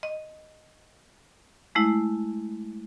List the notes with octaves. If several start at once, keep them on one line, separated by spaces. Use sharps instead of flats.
D#5
G#3 A3 E4